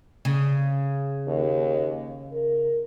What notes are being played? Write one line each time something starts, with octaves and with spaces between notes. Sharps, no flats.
C#3
D#2
A#4